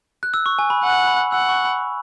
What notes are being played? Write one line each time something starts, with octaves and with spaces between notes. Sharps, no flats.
F#6
E6
C#6
G#5
B5
F#5 G#5
B5
F#5 E6
C#6
B5